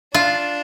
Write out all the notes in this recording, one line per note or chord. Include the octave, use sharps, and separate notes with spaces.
D4 F4